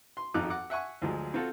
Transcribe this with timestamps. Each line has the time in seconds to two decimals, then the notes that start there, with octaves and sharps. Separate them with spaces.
0.17 C6
0.34 G#1 F2 F3 D#4 D6 F#6
0.50 F#5 D6
0.70 E5 F#5 G#5 C#6
1.02 D2 F3 F#3 G#3
1.34 C4 F4 F#4 A4